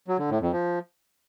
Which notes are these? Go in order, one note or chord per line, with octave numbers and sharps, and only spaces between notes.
F#3
D3
A2
F2
F3